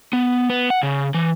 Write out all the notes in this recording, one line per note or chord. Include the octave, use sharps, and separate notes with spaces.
B3
B3
F#5
C#3
E3